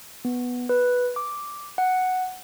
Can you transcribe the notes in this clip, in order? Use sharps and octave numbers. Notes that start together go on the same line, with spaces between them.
B3
B4
D6
F#5